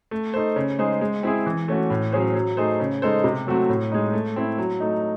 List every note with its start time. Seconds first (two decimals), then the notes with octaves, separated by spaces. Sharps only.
0.11 A3
0.34 D#4 A4 C5
0.56 C#3
0.78 G#3 D#4 G#4 C5
1.01 G#3
1.23 C4 E4 G#4
1.46 E3
1.68 A3 C#4 F#4
1.90 A2
2.12 F#3 C#4 G#4 C5
2.35 F#3
2.57 A3 D#4 G#4 C5
2.80 C#3
3.02 G#3 D#4 A4 C5
3.24 C3
3.47 F#3 A3 C4 F#4
3.69 A2
3.92 G#3 D#4
4.13 A3
4.36 C4 E4
4.58 F#3
4.80 A3 D#4